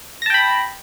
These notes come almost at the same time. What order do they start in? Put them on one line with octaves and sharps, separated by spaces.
A#6 A5 G5 B5